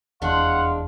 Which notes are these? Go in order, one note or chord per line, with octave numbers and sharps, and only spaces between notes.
F1 E2 G#3 D4 F5 F#5 C6